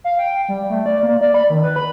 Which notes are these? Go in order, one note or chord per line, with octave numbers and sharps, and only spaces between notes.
F5
G5
G3
A3
D5
A#3
D5
B5
D#3
B4
B5